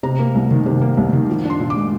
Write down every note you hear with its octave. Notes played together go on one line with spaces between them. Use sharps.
C3 A#5
A#3
C2
D#3
C3
A#3
C2
D#3
F3
D4
C6
A#2
D6
G#3